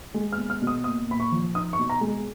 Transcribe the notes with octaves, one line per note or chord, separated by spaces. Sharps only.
G#3
F6
B3
F6
B2
D#6
A#3 D#6
A#2 B5
C#6
F3
D#4 D#6
C#6
B2
A#5
G#3